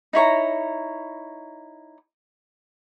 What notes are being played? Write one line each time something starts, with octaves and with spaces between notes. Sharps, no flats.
D#4 E4 C#5 A#5